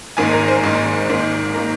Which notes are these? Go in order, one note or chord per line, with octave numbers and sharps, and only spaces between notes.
G#1 G#2 D#3 A#3 G#5
A#4
C5
G#1 G#2 D#3 A#3
G#1 G#2 D#3 A#3
D#3 A#3 A#4